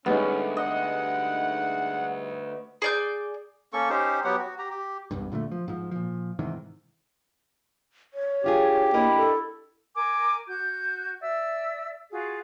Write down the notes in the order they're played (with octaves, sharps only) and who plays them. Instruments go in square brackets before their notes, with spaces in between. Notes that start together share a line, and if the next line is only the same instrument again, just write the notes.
[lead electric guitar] D2 [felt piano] G3 G#3 D#4 [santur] B3 [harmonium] C#4
[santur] D#5 [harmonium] F#5
[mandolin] G#4 D5 G6
[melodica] A#3 C#4 A4 C#6
C#4 D#4 G4 C5
F#3 B3 G4 F#5
F#4
G4 A#5
G4
[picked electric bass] E1 C2 G2
A#2 D3 G3 A3
F3
G#2 F3
A#2 F3
G#2 C3 D#3 E3
[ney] C#5
[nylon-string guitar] D4 F4 G#4 [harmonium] G4
[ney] A#3 [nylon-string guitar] D4 A#4 D#5 [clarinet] E4
[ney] A4
[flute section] A#4 G#5 D6
F#4 G6
D5 E5 E6
F4 F#4 G#4